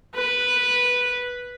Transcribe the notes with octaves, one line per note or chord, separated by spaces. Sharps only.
B4